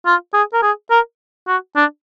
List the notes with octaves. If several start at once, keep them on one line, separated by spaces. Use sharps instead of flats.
F4
G#4
A#4
G#4
A#4
F#4
D4